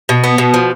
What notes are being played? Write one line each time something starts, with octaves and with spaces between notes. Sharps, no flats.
B2
B3
B2
F3